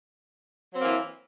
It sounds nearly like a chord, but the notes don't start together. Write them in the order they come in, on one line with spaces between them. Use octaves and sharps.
F#3 C4 A#3 E3